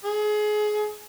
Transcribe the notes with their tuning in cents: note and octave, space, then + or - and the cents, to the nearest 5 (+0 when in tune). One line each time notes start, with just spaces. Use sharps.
G#4 +25